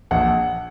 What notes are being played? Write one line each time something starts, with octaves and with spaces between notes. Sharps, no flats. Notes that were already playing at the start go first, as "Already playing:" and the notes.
A#1 F#5